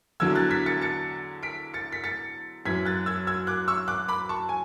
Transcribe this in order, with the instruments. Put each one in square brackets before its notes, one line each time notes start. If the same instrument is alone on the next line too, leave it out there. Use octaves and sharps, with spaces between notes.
[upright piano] E2 D3 F#3 E6 G#6
F#6 A6
G#6 B6
A6 C#7
A6 C#7
B6 D7
A6 C#7
B6
A6 C#7
F#2 E3 G#6 B6
F#6 A6
E6 G#6
E6 G#6
D6 F#6
C#6 E6
D6 F#6
B5 D6
A5 C#6
G#5